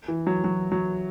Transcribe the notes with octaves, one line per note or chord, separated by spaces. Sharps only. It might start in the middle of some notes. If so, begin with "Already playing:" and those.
E3
F#3
F#3
F#3